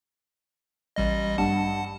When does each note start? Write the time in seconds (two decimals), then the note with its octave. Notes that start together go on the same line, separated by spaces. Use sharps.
0.96 A1 G3 D#5
1.38 G2 F#5 A5